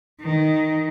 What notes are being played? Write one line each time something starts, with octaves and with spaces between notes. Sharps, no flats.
D#3